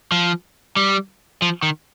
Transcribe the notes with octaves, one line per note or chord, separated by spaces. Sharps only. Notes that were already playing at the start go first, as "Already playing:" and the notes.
F3
G3
F3
D#3